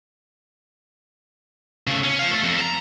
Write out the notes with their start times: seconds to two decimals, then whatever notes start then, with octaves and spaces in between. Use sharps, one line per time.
1.87 C#3 A3
2.04 C#4
2.19 C5 F5
2.30 A3 A4
2.44 F2
2.58 A4 A#5